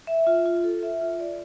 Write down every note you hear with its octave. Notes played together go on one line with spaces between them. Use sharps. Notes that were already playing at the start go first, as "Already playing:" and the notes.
E5
F4
F4
A4
E5
F4
D5